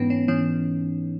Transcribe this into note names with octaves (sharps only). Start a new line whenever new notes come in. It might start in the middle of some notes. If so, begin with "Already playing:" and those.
Already playing: G#2 E3 B3 C#4 D#4
C#4
E3 C#4